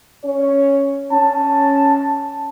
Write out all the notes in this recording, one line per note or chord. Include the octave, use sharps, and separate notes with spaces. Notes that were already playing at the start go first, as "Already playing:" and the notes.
C#4 C#5
C#4 A5